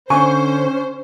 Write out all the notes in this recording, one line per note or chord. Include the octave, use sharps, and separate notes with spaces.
D3 C#4 C5 G#5 C#6